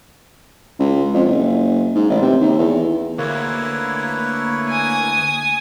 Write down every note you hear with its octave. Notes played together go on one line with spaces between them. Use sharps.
C#2
F2
F#1
G#2
A1
C3
D#2
E2
D2 A#3 E4 B4 C#5
G#5 D#6